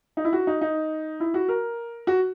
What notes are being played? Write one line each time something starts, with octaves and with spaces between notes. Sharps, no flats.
D#4
E4
F#4
D#4
D#4
E4
F#4
A#4
F#4